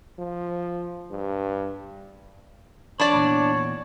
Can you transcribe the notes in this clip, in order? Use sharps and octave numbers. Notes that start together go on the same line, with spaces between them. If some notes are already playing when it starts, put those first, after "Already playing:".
F3
G2
F2 D4 C#5 D5 B5
E2 A#2